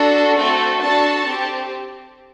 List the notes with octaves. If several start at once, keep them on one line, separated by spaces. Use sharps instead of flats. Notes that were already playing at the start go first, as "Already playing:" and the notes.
Already playing: D4 F#4 A4
A3 C4 F#4 A4
D4 F#4 A4 A5
C4 G4